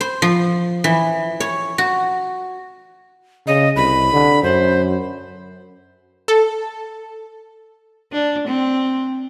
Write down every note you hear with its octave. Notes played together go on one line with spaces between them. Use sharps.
C5
F3
E3
C#5
F#4
C#3 D#5
C2 B5
D3
F#2 C5
A4
D4
C4